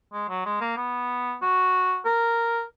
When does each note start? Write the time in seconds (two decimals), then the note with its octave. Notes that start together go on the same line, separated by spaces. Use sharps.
0.13 G#3
0.29 F#3
0.45 G#3
0.61 A#3
0.77 B3
1.42 F#4
2.05 A#4